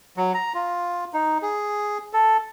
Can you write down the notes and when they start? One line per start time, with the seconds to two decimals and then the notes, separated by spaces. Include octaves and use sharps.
0.17 F#3
0.34 A#5
0.54 F4
1.13 D#4
1.42 G#4
2.13 A4